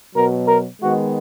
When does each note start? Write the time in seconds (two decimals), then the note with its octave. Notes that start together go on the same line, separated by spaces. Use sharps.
0.13 B2 F#3 B3 A#4
0.46 A#4
0.80 D#3 G#3 B3 F#4